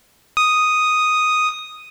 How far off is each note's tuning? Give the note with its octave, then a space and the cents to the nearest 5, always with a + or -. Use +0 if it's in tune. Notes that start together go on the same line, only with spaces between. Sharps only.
D#6 +0